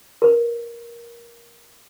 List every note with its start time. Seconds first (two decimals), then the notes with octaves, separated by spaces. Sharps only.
0.22 A#4 B4